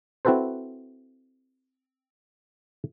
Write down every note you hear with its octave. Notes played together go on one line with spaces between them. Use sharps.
C4 E4 F#4 A4 B4 C5